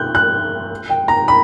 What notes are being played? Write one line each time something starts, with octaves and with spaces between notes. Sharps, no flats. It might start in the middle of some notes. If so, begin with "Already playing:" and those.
Already playing: F#6 G6
F#6
G5
A#5
B5